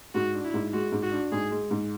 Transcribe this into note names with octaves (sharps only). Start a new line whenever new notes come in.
G#2 F#4
D4
E4
G#2
G#3 F#4
G#2
F#4
D4
G#2 G#4
G#3
G#2